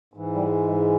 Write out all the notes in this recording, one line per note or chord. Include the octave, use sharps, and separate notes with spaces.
G#2 E3
G3
G#3
G#3